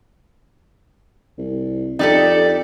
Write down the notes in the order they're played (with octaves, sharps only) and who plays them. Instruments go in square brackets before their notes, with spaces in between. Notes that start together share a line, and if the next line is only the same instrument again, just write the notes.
[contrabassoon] C2
[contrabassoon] F2 [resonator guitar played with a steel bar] D#4 G4 A4 [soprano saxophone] D5